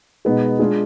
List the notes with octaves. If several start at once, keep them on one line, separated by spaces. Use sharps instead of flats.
B2 G#3 B3 D#4 G#4
G#3 D4 F4 G#4